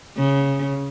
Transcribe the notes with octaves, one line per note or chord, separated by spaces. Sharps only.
C#3